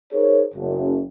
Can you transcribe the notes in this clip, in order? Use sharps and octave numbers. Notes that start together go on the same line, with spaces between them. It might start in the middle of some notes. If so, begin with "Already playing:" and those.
D#4 G#4 A#4 C5 C#5
F#1